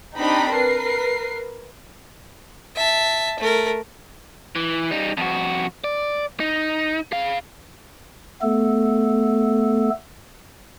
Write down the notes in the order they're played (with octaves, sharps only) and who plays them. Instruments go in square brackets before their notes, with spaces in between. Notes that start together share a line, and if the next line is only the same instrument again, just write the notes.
[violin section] C4 D4 D#4 G4 A#5 B5
A#4 B4 C7
[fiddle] E5 A5
A3 A#4
[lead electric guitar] E3
G3 D#4
F2 F#4
D5
D#4
G#4 F5
[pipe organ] A3 B3 A4